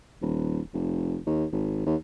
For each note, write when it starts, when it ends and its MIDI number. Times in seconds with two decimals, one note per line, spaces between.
0.22 0.60 27
0.74 1.19 29
1.27 1.45 39
1.53 1.86 32
1.86 1.96 39